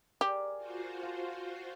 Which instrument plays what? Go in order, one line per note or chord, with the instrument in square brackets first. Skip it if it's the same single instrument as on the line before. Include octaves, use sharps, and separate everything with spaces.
[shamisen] G4 [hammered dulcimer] G#4 A#4 D5
[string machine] F4 F#4 C5
[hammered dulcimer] F5 A5